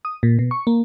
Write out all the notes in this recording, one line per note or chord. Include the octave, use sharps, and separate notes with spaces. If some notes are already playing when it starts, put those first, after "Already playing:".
D#6
A#2
B2
C#6
A#3